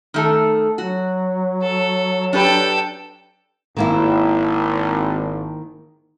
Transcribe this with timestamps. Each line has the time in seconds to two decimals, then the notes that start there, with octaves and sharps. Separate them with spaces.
0.14 D#3 A3 A4
0.78 F#3 F#4
1.62 A4
2.33 D4 G4 A4 B4 G5
3.77 G#1 D#3 A#3 E4